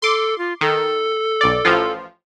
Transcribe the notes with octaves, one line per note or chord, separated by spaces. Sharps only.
A4 C6 D6
F4
D#3 A4
B1 D5
A1 F3 F4